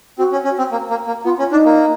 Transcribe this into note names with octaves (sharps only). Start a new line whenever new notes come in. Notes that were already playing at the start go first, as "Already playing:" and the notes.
C4 F#4
C#4
C#4
C4
A#3
A#3
A#3
B3 F4
C#4
D4 D#4
A#3